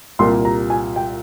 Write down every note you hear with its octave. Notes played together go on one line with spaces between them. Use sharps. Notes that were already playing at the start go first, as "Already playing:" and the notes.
C2 A#2 G3 A#3 C6
A#5
G#5
G5